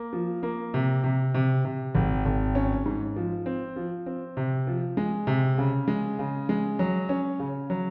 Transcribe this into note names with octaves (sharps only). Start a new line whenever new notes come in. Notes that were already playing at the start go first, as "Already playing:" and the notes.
Already playing: A#3
F3
A#3
C3
C3
C3
C3
G#1
G#1
C#4
G#2
F3
C4
F3
C4
C3
F3
G#3
C3
C#3
G#3
C#3
G#3
F#3
C#4
C#3
F#3